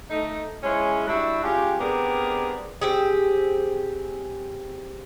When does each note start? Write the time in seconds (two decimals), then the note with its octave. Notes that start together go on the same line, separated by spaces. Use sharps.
0.10 A3 D#4
0.63 G#3 C#4 E4
1.07 G3 D4 E4 F#4 E5
1.43 G#3 C#4 F4 G4
1.79 B3 C4 D4 G4 G#4 A#4
2.81 C4 G4 G#4